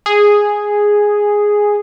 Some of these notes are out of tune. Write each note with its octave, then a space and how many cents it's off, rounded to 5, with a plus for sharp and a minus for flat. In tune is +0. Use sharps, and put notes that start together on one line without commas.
G#4 -5